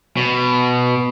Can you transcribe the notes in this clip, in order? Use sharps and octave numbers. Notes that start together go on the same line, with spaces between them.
B2